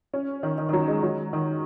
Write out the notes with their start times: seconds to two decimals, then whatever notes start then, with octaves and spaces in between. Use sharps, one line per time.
0.14 C#4
0.43 D#3
0.58 D#3
0.69 D#3
0.73 F#3
0.88 G#3
1.03 F#3
1.33 D#3